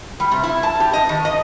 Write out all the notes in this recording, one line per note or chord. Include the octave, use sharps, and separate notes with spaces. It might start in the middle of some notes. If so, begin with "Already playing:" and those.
G3
C3
E4
A5
G4
D#5
D#3
D#5